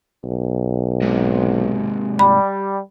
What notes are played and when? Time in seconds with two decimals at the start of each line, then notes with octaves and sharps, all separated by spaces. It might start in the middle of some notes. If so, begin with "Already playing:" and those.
0.24 B1
1.02 G#2 C3
2.19 G3 B5